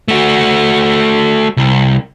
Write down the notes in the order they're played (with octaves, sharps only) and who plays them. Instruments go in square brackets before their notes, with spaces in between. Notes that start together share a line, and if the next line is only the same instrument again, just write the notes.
[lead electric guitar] A3 F#4
C2